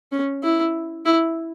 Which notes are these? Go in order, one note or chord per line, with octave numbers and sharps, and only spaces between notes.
C#4
E4
E4